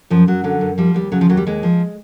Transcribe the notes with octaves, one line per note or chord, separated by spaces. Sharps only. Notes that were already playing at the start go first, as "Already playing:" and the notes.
F#2 F3
F#2 F#3
D3 F#3
F#2
F3 G3
D#2 G3
C#3 F#3
F3
D#2 F#3
G3
D#2 G#3
F3